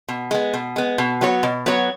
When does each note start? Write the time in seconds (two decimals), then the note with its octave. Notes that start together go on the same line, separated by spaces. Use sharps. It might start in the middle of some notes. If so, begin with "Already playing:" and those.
0.08 B2
0.31 G#3 B3
0.54 B2
0.76 G#3 B3
0.98 B2
1.21 F#3 B3 F#4 C#5
1.43 B2
1.66 F#3 B3 F#4 C#5